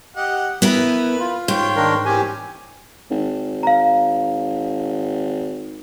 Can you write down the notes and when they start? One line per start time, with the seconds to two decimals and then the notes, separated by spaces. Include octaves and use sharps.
0.17 G4 D#5 F#5
0.62 E3 B3 E4 A#4 B4
1.19 F4
1.48 G#2 C#5 G5 C6
1.76 D#3 D4 A#4
2.06 E3 C4 C#4 G4 G#5
3.11 G#1
3.63 F5 A#5